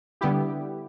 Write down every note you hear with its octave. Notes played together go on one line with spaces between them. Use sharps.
D3 G3 B3 E4 G4